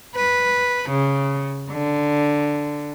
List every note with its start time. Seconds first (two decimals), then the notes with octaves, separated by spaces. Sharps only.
0.16 B4
0.90 C#3
1.71 D3